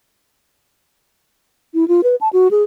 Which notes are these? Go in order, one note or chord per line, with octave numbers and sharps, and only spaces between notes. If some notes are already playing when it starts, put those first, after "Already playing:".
E4
F4
B4
A5
F#4
G#4